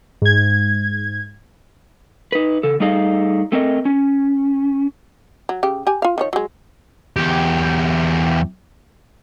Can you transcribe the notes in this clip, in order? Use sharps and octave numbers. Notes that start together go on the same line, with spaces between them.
G#2 G#6
D#4 B4
C#3 A4
G3 A3 D#4 G#4 D#5 F5
A3 C4 A#4 D#5
C#4
F#3
C#3 G4
G4 G#5
F4 F5
D#3 F3 C#5
F#3 G#3
E2 G4